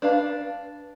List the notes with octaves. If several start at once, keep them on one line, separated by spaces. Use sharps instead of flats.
D4 B4 F5 A5